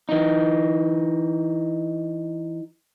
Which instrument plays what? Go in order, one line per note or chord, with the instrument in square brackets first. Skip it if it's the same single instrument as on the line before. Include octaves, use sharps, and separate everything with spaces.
[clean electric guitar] E3 D#4